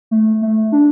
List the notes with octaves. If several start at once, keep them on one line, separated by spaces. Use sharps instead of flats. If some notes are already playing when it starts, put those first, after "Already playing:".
A3
A3
D4